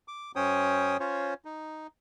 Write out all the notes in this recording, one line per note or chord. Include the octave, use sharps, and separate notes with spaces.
D6
F#2 C#4 C5 C#5 G5 D#6
C#4 F4 C5 C#5
D#4